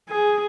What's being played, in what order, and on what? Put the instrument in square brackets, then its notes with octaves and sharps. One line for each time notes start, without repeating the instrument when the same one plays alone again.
[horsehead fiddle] G#4